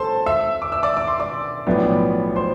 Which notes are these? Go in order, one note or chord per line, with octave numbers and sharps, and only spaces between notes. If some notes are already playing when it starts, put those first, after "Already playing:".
Already playing: B1 A4 C5 A5 C6
E5 E6
D6
E6
D5 D6
D6
C6
D5 D6
B1 A2 F3 B3 D4
C5 C6